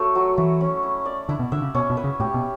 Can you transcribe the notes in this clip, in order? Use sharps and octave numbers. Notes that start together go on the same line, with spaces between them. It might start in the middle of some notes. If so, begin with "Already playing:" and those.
Already playing: A3 F#4 C#5
F#3
E3 E4
C#4
E4
D5
D3 E4
B2
D3 E5
C#3
B2 C#4
B2
B4
C#3
A2 G4
B2